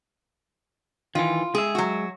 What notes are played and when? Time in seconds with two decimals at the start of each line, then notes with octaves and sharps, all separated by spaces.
1.15 D#3 E3 F4
1.55 G#3 G#4 E5
1.75 F#3 F#4